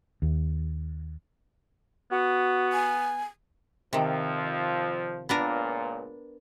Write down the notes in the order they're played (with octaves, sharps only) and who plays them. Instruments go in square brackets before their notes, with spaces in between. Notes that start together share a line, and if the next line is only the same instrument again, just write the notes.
[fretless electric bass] D#2
[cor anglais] B3 [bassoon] F#4
[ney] G#5
[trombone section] F2 F3 [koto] C3 D#3
[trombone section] C#2 A#2 [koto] B3 D4 A#4